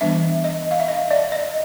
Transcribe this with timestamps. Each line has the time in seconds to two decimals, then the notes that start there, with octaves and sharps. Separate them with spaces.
0.01 E3 G3 B3 D4 E5
0.44 D#5
0.71 F5
0.80 E5
0.88 D#5
1.11 D5
1.32 D#5